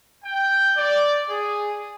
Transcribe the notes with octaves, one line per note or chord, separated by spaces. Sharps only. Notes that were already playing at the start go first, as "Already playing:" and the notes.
G5
D5
G#4